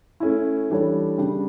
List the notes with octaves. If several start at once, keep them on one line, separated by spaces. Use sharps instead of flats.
A3 C#4 E4
E3 G3 D4 A4 C#5
C#3 G3 D4